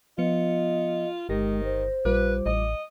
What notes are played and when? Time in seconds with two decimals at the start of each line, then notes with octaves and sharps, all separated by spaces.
0.18 F3 B3 F4 D#5 C#7
1.29 G1 D#3 G#3 G4 A#6
1.64 C5
2.05 A#1 G3 F4 B4 D6
2.46 A1 D#5